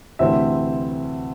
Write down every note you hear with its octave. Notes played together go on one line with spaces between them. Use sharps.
D2 C3 E3 A3 C4 E5